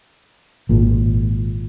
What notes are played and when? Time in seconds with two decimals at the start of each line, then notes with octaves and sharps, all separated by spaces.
0.69 G#1 A#2